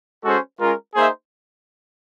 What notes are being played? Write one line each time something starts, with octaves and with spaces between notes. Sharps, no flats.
G#3 C#4 F#4 A4 C5
G#3 C#4 F4 A#4
A#3 D#4 G#4 C5 E5